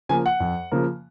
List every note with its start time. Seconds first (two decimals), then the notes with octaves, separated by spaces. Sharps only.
0.09 C#3 F3 A#3 G#5
0.26 F#5
0.40 F2
0.72 C#3 F3 A#3